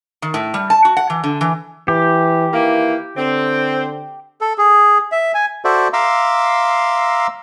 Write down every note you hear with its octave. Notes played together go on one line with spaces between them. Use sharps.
D#3
A2
G3
A5
F#4
F#5
E3
D3
E3
E3 G4
D#3 E3 A#3 E4
D3 C4
A4
G#4
E5
G#5
F#4 A4 C5 D5 E5
E5 F5 A#5 C6 D6 E6